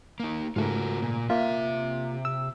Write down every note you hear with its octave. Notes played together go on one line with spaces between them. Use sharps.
A#3 D#4
G#2 C#3 A3 F4 F#4 A#4
A#2 A#3
C3 A#3 F4 E5
E6